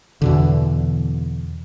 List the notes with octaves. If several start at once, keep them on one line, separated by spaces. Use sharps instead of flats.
E2 B2 D3